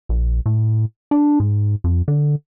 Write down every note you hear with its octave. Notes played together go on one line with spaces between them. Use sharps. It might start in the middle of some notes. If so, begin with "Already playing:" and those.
A#1
A2
D4
G#2
F2
D3